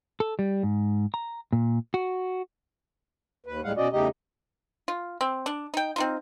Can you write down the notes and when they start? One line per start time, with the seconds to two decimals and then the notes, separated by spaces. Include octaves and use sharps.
0.20 A4
0.39 G3
0.63 G#2
1.14 A#5
1.53 A#2
1.94 F#4
3.46 D#2 B4
3.64 D2 A2 G3 G#3 F5 F#5
3.77 B2 C#4 F#4 D5 D#5
3.93 E2 C#3 A3 D#4 G4 D#5
4.88 F4
5.21 C4
5.46 D4
5.74 D#4 G5
5.96 C4 D#4 F4